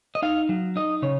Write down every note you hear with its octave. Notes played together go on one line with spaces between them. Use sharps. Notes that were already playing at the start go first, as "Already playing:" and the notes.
D#5
D#4 F5
F#3
D#4 D#5
C#3 C#5